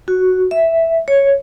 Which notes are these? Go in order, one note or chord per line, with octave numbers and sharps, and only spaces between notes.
F#4
E5
C#5